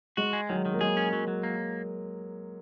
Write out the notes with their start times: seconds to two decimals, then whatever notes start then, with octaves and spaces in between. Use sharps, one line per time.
0.17 G#3 F#4
0.33 G#3
0.49 D#3 F#3
0.65 D#3
0.74 A#3
0.81 G#3 G#4
0.97 C#4
1.13 F#3
1.28 F#3
1.43 A#3